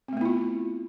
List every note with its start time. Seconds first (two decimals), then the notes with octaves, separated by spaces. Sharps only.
0.08 C4
0.13 A3
0.17 B3
0.21 E4
0.25 F4